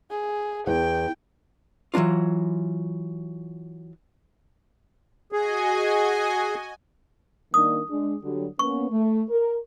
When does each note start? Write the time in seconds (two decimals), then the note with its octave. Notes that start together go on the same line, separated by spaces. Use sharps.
0.11 G#4
0.67 E2 G5
1.94 E3 F#3 C#4 D4 F4
5.32 F#4 G#4 D#5 G#5
7.54 D#3 A#3 D4 D#6
7.90 G#3 D4
8.23 D3 F#3 G3
8.59 A#3 B3 C#4 C#6
8.90 A3
9.30 A#4